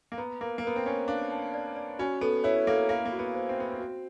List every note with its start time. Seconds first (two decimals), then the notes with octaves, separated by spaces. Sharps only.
0.12 A#3
0.18 B3 A#5
0.41 A#3 A#4
0.58 A#3
0.63 B3 A#4
0.76 C4
0.85 C#4 C#5
1.08 D4 F5
1.31 A5
1.54 D5
1.76 D5
1.99 C#4 F#4
2.21 B3 A4
2.44 E4 C#5
2.67 A#3 A4
2.89 A#3 F5
3.06 A#3
3.12 F#4
3.19 B3
3.35 C5
3.49 C4
3.57 B3 C5
3.72 C4
3.80 F#4